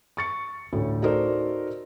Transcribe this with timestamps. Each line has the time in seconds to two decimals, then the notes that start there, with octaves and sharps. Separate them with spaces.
0.17 C#6 A6 C#7
0.73 A1 D2 A2 D3
1.02 D#4 F#4 A4 A#4 C5 D5